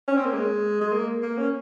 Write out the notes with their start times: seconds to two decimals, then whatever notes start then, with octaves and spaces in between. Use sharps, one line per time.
0.08 C#4
0.17 C4
0.25 A#3
0.34 G#3
0.81 G#3
0.92 A#3
1.23 A#3
1.38 C#4